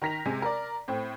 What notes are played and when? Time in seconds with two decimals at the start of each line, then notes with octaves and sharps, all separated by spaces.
0.02 D#3 A#4 A#6 B6 F7
0.25 C3 G#3 G#5
0.42 A#4 D5
0.88 A2 C4